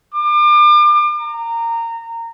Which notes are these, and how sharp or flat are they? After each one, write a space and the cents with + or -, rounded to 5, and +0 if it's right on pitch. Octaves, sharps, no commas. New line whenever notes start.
D6 +35
A#5 -20